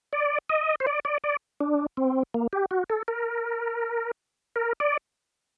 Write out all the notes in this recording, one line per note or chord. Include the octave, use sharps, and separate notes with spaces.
D5
D#5
C5
D5
D5
D5
D4
C4
A#3
G4
F#4
A4
A#4
A#4
D5